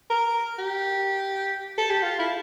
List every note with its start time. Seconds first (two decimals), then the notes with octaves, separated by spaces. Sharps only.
0.10 A#4
0.59 G4
1.78 A4
1.90 G4
2.03 F4
2.19 E4